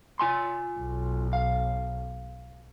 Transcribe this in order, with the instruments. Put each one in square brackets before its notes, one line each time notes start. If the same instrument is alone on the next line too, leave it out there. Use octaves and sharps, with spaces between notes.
[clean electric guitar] F4 G#5 C6
[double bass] B1
[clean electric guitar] F5